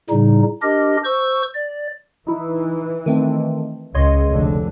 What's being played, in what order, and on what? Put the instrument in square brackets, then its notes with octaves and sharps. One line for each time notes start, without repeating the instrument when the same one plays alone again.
[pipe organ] A2 C#3 G3 D#4
D4 G4 A#4 D#5
C5 C#6 E6
D5
[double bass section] E3 [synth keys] D#4 E4
[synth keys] D#3 A3 C4
[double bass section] C#2 [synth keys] C#5 D#5 C6
[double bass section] F1 D3